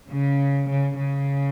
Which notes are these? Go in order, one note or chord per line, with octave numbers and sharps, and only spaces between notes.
C#3
C#3
C#3